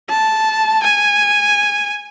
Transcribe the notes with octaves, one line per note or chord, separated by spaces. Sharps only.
A5
G#5